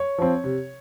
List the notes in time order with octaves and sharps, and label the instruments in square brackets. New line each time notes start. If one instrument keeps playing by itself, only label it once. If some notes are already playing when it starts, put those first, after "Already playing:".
Already playing: [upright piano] C#5
F3 C4
C3